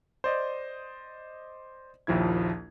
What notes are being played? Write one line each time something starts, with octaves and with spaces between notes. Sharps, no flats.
C5 D5 D#5
A#1 D#2 F3 E4 G#6